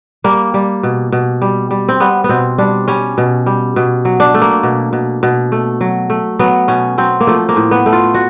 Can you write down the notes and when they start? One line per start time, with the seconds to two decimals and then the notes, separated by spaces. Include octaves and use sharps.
0.24 G3 A#3
0.54 G3
0.83 B2
1.12 B2
1.42 G3
1.71 G3
1.89 C4
2.00 G3 B3
2.24 B3
2.29 B2 C4
2.58 G3 D4
2.88 G3 C#4
3.18 B2
3.46 G3
3.76 B2
4.05 F#3
4.20 D4
4.34 A3
4.42 A#3
4.63 B2
4.93 B2
5.23 B2
5.52 A3
5.81 F#3
6.10 A3
6.39 F#3 B3
6.68 B2 C#4
6.98 F#3 C4
7.21 A#3
7.27 F3 A3
7.49 A#3
7.56 A2
7.71 B3
7.86 A3
7.93 F4
8.14 F#4